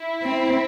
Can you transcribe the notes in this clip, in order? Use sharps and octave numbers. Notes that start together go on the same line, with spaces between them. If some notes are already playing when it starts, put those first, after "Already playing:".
Already playing: E4
C4